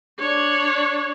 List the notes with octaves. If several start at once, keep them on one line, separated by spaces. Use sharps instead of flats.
D4 C#5